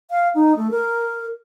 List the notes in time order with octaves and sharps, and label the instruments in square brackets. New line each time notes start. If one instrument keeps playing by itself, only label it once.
[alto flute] F5
D#4
A3
A#4